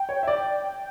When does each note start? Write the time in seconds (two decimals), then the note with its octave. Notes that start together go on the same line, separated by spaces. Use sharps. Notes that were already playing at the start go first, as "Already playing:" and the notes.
Already playing: G5
0.09 C#5
0.23 E5
0.28 D5